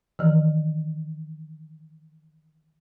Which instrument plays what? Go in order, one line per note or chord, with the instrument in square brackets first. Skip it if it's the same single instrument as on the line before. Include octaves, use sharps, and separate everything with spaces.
[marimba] D#3 E3